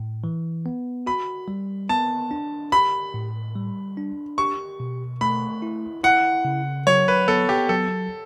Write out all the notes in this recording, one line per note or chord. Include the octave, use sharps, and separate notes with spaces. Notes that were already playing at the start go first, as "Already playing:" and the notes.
Already playing: A2
E3
B3
F#4 B5
G3
B3 A5
D4
G4 B5
A2
G3
D4
G4 C#6
B2
A3 B5
E4
E4 F#5
C#3
F#3 C#5
B4
B3 A4
G4
F#3 A4